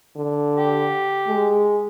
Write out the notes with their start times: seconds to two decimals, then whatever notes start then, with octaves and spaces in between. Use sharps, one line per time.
0.17 D3
0.55 G4
1.28 G#3